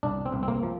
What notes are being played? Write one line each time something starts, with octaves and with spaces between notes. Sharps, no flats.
C2 D4
C4
C2
C4
A#3
F3